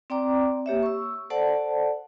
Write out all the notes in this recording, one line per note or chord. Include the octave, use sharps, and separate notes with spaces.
C4 D5 G5 A#5 D6
A#3 G4 C#5 E5
C#6 E6
A4 C5 D5 F#5 A5